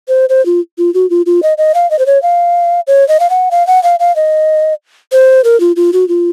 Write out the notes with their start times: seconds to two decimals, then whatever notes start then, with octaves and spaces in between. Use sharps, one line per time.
0.08 C5
0.29 C5
0.46 F4
0.78 F4
0.94 F#4
1.10 F4
1.26 F4
1.43 D#5
1.58 D#5
1.74 F5
1.91 D#5
1.99 C5
2.06 C#5
2.22 F5
2.87 C#5
3.08 D#5
3.20 F5
3.30 F#5
3.51 F5
3.67 F#5
3.83 F5
4.00 F5
4.16 D#5
5.12 C5
5.44 A#4
5.60 F4
5.76 F4
5.93 F#4
6.08 F4